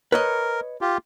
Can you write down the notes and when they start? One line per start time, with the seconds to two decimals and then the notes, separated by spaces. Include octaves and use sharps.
0.12 A#4 B4 C#5 D#5
0.81 F4 G4